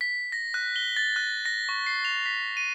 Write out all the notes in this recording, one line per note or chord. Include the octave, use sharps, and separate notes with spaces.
B6
A#6
F#6
G7
A6
F#6
A#6
C#6
C7
F7
B6
D#7